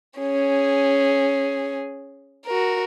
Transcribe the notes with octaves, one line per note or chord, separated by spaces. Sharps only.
C#4 G#4
F#4 A#4